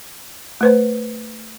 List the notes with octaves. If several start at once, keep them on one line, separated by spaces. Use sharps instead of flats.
A3 B4 C5